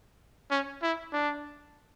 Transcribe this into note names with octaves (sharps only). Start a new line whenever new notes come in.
C#4
E4
D4